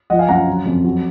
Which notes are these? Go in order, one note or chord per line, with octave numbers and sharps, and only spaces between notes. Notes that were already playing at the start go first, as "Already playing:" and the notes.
F3 D#5 F#5
F5 G#5
F#2 F#5 A#5
F#3
F2
F#3